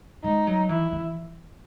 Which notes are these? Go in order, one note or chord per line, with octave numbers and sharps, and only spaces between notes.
G#3 D#4
F#3
E3 E4
E3